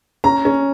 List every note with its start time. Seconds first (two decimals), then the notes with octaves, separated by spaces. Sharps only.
0.24 C#4 A#5
0.45 C#4